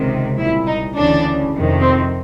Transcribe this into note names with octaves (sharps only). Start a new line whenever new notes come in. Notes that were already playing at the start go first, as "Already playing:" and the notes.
Already playing: C#2 C3 D#3
C2 A#2 E4
D#4
D2 C#3 E3 D4
F2 C3 D#3
C4